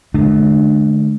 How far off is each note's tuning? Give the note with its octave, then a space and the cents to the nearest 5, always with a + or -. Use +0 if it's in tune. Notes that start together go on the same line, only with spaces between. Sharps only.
D3 +15 A3 -45 D4 +25